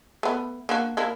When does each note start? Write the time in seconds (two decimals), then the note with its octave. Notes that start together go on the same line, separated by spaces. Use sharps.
0.23 A3 B3
0.69 A#3 D4 F#4
0.97 A#3 D4 E4